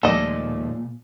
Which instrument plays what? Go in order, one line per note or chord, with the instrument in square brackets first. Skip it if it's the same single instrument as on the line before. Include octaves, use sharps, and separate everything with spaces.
[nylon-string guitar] D#2 D5 [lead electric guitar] A#2 [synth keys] F3 G#3 A3 [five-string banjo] A4 D#5